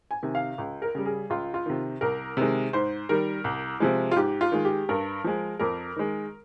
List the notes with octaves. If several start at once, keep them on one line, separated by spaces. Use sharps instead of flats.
G#5
C3 D#3
F5
C#2
A#4
C#3 G3
G#4
C#2 F4
F4
C3 D#3
C2 A#4
C3 D#3 G#3
G#2 C5
D#3 G3 A#4
C2
C3 F3 G#3
F4
G#2 G4
F4
D#3 G#3
G4
G2 A#4
F3 G#3
F2 A#4
D#3 G#3